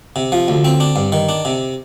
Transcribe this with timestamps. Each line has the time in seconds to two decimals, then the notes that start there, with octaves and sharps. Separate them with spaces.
0.16 C3
0.32 F3
0.48 D2
0.65 C4
0.80 D4
0.96 G2
1.12 D#3
1.29 D4
1.45 C3